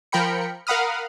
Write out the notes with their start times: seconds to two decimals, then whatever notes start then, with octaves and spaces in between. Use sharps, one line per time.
0.12 F3 A#4 G5 B5 C#7
0.67 A#4 F5 F#5 B5 D#6 F6